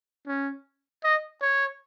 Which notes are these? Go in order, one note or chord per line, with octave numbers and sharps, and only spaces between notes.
C#4
D#5
C#5